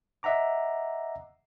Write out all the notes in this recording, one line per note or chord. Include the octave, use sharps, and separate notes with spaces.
D#5 E5 F#5 A#5 D6